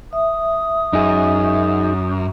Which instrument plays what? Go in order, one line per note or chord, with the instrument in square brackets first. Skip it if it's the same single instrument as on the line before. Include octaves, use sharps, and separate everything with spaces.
[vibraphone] E5 [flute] D#6
[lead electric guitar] F#2 [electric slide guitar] D#4 G#4